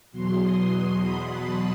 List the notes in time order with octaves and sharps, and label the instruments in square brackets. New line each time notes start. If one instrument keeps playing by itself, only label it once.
[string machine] E2 B2 F#3 C6
D#6
C6
B5
A5